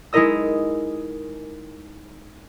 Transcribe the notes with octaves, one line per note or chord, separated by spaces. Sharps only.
G#3 D#4 E4 A#4 D#5 E6